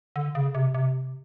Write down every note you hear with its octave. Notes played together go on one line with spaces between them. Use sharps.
D3
C#3
C3
C3